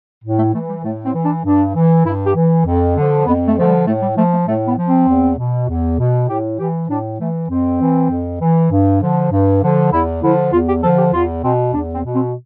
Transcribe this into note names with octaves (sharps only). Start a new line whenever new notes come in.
A2
A3
E3 A3
G3
A2 A3
C4
E3
D4
G2 D4
E3
G2 E4
G4
E3
F2
D3 F3
F2 B3
A3
D3 F3 A3
G3
A2 A3
G3
F3 A3
A3
A2 A3
B3
F3
C4
E2
B2
E2
B2
A2 G4
E3 G4
A2 D4
E3 A3
F2 C4
E3
F2
E3
G2
D3 F3
G2
D3 F3
E2 E4
D3 F3 E4
E2 F4
G4
D3 F3 A4
G4
E2 F4
B2 C4
E2 D4
C4
B2
C4